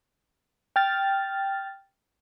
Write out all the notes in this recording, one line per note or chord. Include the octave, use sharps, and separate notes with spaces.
G5 F6 A6